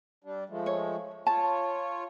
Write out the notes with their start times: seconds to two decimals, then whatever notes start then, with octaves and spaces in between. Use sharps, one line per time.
0.24 G3 D4
0.49 F3 G#3 A3
0.66 C#5
1.27 F4 C#5 A5